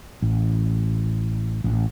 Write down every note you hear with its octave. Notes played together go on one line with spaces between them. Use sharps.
A1
A1